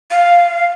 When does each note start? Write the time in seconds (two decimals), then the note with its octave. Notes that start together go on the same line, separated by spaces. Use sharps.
0.11 F5